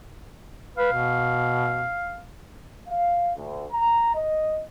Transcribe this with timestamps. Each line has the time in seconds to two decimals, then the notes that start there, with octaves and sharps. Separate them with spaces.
0.78 B4 F5
0.93 B2
2.87 F5
3.37 D2
3.72 A#5
4.15 D#5